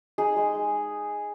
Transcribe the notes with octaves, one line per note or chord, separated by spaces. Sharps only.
D#4 G#4
G#3
G#3